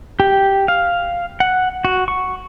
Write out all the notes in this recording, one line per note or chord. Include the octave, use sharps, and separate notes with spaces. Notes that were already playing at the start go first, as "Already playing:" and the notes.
G4
F5
F#5
F#4
C#6